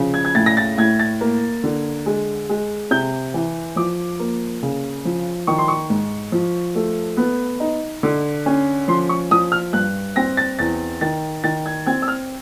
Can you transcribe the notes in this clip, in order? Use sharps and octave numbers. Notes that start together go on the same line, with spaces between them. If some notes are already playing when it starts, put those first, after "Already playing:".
Already playing: C#3 F3
G#6
G#6
A2 A6
A#6
A6
A2 G#6
A6
A#3
D3
G#3
G#3
C3 G6
E3
F3 D6
A#3
C#3
F3
D#3 C#6
C6
C#6
G#2
F3
A3
B3
D#4
D3
C#4
F3 C6
C#6
F3 D#6
F6
G2 F#6
C4 A#6
A6
E2 A6
D#3 A6
D#3 A6
G#6
C4 G#6
E6
F6